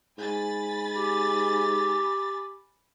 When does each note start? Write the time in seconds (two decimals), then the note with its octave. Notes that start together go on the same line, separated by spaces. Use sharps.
0.18 G#2 G#5 B5 A6
0.96 G4